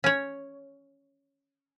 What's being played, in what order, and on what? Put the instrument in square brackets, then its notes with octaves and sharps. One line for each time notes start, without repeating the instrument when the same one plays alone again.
[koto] C#4 C#5